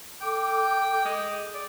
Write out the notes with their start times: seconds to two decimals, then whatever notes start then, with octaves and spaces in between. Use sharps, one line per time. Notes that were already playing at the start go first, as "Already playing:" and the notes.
0.21 A4 G5 D6
1.05 G#3
1.54 D5 D6